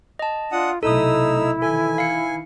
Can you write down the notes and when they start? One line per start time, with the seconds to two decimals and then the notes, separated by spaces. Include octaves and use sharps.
0.19 D#5 A5
0.52 D4 F4 F#5 D#6
0.83 B1 C3 A3 D#4 E4 A4 D#6 E6
1.62 D#3 E3 A4 G#5
1.98 F5 C#7